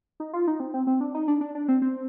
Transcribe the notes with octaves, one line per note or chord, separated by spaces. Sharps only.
D#4
F4
D#4
C4
C4
C4
D4
D#4
D4
D4
D4
C4
C4